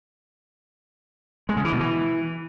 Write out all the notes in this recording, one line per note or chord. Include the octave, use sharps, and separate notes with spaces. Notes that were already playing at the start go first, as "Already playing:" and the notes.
G#3
C#3
E3
B2
E3